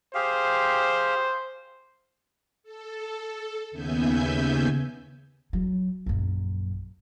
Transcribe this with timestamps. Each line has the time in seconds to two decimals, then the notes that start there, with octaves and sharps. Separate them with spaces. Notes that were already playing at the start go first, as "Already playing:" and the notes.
0.15 G4 G#4 C5 F5
2.63 A4
3.71 D#2 C#3 B3 E5 G#5 G6
5.53 F#3
6.06 A#1 F#2